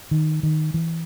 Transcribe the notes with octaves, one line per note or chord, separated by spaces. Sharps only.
D#3
D#3
E3